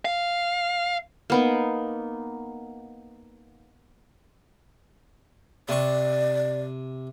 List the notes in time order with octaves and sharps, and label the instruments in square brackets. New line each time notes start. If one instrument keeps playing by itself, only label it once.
[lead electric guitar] F5
[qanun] A#3 B3 D#4
[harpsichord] C3 C#6 [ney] D5